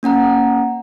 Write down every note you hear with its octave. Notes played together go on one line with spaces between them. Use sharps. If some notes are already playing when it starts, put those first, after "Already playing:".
A#3 C#4 F#5 A#5